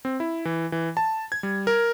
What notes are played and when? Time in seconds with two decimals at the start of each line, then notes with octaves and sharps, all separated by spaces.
0.05 C4
0.20 E4
0.45 E3
0.72 E3
0.97 A5
1.32 G#6
1.43 G3
1.67 A#4